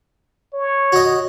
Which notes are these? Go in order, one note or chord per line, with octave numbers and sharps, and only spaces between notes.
C#5
F#4 D#5